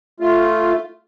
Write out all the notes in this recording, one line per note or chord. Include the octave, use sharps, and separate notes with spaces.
A3 F4